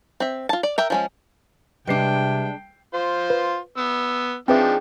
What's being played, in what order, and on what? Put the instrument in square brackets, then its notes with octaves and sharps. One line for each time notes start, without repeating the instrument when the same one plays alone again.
[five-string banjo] C4 E5
F4 A5
D5
A#4 E5 G5
F3 G#3 C#4
[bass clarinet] C3 [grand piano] G3 B4 C7 [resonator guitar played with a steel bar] G#3 D4 [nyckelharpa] G5
[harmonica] F4 C5
[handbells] B4
[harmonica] B3 E6
[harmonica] F3 D4 D#4 [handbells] C4 B4 E5 [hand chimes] G#4 G5